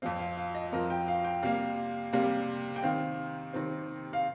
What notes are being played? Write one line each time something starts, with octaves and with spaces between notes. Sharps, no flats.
F2 F3 C4 F5
F5
F5
D#5
F2 F3 C4 A#4
G5
F5
G5
C3 G3 A#3 F5
C3 G3 A#3
G5
C3 D#3 C4 F5
C3 D#3 C4
F5